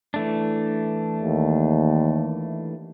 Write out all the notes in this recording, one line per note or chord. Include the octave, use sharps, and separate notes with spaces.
E3 A3 D4
D#2